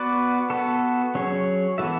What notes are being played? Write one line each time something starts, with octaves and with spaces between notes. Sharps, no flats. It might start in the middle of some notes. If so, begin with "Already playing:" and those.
Already playing: B3 F#4 B4 D5
B3 F#4 A4
F#3 C#4 G#4 C#5
E3 B3 F#4 A4 E5